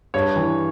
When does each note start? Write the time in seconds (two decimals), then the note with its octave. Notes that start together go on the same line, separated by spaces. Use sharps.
0.14 G2 C#5
0.36 E3